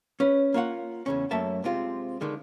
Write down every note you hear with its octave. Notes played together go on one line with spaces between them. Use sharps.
C#4 B4
A#3 F4 C#5 F#5
E2 C#3 C#4
F#2 A3 A#3 E5 A5
C3 G#3 C4 F4
D3 D#3 G#3